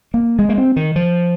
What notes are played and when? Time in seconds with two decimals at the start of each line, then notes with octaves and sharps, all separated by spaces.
0.14 A#3
0.39 G#3
0.49 A#3
0.58 C4
0.76 D#3
0.96 F3